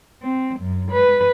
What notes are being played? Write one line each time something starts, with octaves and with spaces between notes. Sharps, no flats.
C4
F#2
B4